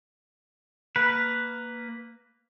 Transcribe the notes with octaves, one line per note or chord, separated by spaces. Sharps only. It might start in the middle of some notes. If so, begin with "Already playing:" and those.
A#3 B4